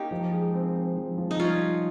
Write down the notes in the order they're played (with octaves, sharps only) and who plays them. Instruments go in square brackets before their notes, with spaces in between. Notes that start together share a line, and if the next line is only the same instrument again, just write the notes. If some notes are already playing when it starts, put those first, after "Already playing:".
Already playing: [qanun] A#3 C#4 D#4 G4
[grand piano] F3
G#3
C4
C4
F3
F3
[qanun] D#4
[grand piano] G3 [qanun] C#4 F4
[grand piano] G3